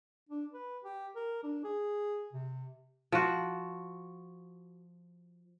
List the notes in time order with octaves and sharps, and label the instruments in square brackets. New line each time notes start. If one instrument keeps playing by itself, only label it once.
[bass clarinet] D4
B4
G4
A#4
D4
G#4
C3
[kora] F3 F#4